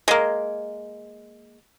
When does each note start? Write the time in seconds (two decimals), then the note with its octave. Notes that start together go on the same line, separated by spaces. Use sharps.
0.08 G#3 A#3